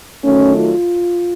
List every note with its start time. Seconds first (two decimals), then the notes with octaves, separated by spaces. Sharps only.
0.24 D#3 F#3 A3 C#4
0.55 F4